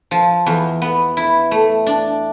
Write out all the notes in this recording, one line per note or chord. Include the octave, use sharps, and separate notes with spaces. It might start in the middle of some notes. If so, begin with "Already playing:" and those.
F3
E2
B3
E4
A3
D4